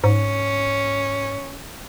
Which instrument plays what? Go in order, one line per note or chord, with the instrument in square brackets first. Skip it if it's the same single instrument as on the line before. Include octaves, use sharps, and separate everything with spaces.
[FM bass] G#2 [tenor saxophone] C#4